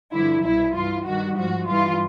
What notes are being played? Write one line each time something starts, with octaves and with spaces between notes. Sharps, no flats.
G2 D3 F3 E4
C2 B2 G3 E4
G2 E3 G3 F4
G2 D#3 G3 F#4
G#2 F3 F#4
G2 E3 G3 F4